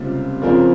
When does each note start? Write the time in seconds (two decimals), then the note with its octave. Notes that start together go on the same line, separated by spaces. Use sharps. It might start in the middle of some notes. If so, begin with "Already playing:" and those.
Already playing: C#2 C3 G3 A#3 F4
0.42 C#3 F3 C4 F4 A#4